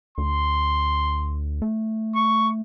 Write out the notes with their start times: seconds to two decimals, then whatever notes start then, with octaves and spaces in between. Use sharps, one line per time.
0.18 D2 C6
1.62 A3
2.15 C#6